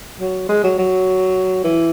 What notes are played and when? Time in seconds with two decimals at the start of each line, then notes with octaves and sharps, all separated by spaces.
0.20 F#3
0.49 G#3
0.64 F#3
0.78 F#3
1.64 E3